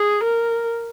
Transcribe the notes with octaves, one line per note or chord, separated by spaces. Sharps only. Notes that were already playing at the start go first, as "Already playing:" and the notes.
Already playing: G#4
A#4